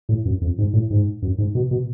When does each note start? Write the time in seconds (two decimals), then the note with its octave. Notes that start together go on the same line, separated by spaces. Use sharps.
0.09 A2
0.25 F#2
0.41 F2
0.58 G#2
0.73 A2
0.90 G#2
1.22 F#2
1.38 G#2
1.55 B2
1.71 B2